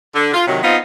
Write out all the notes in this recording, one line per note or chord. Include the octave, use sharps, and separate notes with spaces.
D3
F4
C3 D#3 F#3
B3 C4 D#4 F4